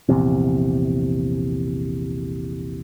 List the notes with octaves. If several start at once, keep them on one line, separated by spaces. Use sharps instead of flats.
A#1 E2 C3